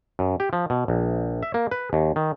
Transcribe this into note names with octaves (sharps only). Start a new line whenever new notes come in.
F#2
G4
F3
B2
A#1
E5
A#3
B4
D#2
D#3